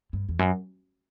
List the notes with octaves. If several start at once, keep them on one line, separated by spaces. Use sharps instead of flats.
G2
E2
F#2